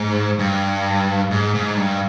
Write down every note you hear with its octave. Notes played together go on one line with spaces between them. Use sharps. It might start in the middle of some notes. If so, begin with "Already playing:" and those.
Already playing: G#2
G2
G#2
G#2
G2